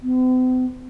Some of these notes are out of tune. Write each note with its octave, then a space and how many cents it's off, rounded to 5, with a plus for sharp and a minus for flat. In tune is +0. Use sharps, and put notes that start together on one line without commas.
C4 -45